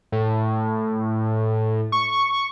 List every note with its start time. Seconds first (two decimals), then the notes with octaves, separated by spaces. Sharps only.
0.12 A2
1.92 C#6